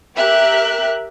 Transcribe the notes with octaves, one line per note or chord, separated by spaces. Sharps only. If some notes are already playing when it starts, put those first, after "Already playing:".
G4 A#4 E5 F#6